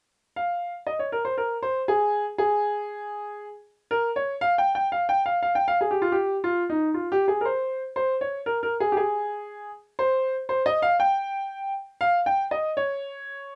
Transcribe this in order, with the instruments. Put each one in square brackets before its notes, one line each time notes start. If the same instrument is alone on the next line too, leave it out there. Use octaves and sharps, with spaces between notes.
[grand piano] F5
D#5
C#5
A#4
C5
A#4
C5
G#4
G#4
A#4
C#5
F5
G5
G5
F5
G5
F5
F5
G5
F5
G#4
G4
F4
G4
F4
D#4
F4
G4
G#4
A#4
C5
C5
C#5
A#4
A#4
G#4
G4
G#4
C5
C5
D#5
F5
G5
F5
G5
D#5
C#5